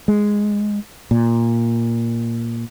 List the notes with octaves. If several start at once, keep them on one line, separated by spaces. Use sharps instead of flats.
G#3
A#2